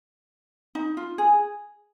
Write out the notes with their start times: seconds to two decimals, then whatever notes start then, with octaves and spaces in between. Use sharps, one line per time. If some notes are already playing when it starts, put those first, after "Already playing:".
0.75 D#4
0.97 F4
1.18 G#4